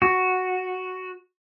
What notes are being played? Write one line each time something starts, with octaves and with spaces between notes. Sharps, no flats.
F#4